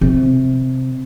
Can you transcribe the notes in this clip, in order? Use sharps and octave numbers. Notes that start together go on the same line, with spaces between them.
C3